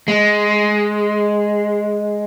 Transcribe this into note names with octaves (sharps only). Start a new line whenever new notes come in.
G#3